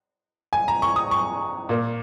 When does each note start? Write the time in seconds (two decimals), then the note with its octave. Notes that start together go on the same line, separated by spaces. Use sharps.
0.53 G#5
0.68 A#5
0.82 C#6
0.96 D#6
1.11 C#6
1.69 A#2 A#3